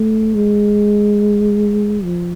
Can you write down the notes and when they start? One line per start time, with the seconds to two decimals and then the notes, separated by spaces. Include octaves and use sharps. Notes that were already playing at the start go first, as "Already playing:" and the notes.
Already playing: A3
0.35 G#3
2.03 F3